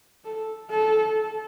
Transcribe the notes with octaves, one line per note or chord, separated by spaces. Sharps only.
A4
A4